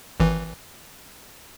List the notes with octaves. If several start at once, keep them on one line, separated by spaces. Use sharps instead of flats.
G#1 E3